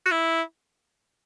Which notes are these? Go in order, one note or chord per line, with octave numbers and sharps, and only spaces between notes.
F#4
E4